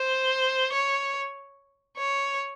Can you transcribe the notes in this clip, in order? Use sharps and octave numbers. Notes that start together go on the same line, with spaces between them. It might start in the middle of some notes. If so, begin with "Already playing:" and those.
Already playing: C5
C#5
C#5